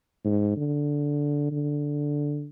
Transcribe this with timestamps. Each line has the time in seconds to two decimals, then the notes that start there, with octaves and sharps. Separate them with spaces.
0.25 G#2
0.56 D3
1.51 D3